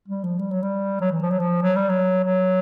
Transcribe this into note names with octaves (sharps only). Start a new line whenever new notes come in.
G3
F3
G3
F#3
G3
F#3
E3
F3
F#3
F3
F#3
G3
F#3
F#3